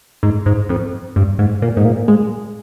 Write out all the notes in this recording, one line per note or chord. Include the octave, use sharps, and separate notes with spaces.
G#2
G#2
F2
G2
G#2
A#2
G#2
A#2
G#3